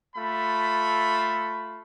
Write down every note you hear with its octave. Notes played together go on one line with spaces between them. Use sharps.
A3 F4 B5